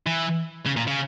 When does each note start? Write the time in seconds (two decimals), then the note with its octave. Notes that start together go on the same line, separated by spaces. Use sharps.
0.06 E3
0.66 C#3
0.77 A#2
0.87 C#3